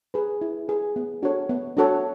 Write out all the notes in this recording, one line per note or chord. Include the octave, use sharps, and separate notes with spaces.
G#4 B4
E4
G#4 B4
B3
D4 F#4 A4 C#5
B3
D4 F#4 A4 C#5